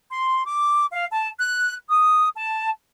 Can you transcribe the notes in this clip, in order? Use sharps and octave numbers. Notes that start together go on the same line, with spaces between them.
C6
D6
F5
A5
F#6
D#6
A5